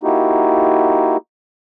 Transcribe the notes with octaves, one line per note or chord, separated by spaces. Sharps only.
A#3 D#4 E4 F#4 G4